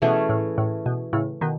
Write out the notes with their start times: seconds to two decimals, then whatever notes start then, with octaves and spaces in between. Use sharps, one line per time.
0.02 B2 E3 A3 C#4 G#4
0.29 A2
0.58 A2
0.86 B2
1.13 A2 C#3
1.41 B2 D#3